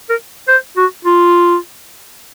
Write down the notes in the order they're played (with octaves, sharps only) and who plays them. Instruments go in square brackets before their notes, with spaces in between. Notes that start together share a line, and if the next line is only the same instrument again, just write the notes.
[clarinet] A#4
C5
F#4
F4